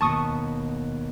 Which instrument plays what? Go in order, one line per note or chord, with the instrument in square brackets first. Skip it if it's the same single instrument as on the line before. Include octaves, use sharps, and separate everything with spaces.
[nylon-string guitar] D#2 B2 [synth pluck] A5 C#6 D#6